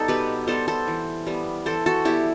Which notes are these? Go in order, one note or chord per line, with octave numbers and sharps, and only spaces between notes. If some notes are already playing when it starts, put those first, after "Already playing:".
Already playing: G3 B3 D#4 A4
B2 G4 B4
G3 B3 A4 C5
A4 C5
E3
G3 B3
E3 A4 C5
F#4 A4
G3 B3 E4 G4